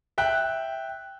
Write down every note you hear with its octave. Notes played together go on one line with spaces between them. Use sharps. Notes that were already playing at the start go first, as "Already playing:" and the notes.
E5 G5 F#6